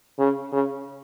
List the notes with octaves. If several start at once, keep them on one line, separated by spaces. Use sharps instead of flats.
C#3
C#3